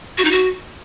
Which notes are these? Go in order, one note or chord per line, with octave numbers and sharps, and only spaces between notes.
F#4
D#4
F#4